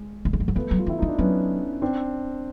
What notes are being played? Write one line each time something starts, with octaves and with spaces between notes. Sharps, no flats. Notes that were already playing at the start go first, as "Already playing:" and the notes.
Already playing: G#3
A3
G#3
G3
F#3
F3 A3 B3
F#3
F4
E3
E4
E3 D#4
D4
F#3 B3 C#4
C4 D4